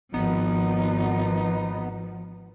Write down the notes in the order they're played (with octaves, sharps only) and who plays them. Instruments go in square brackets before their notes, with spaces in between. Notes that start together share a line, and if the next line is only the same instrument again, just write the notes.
[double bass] G#1 [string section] F3 [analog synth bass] B3 [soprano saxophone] D#4